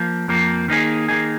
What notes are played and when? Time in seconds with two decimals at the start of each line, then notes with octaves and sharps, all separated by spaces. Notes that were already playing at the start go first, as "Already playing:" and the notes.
Already playing: F3 A#3
0.28 F2 F3 A#3
0.68 D#3 A#3 D#4 G#4
1.08 D#3 A#3 D#4 G#4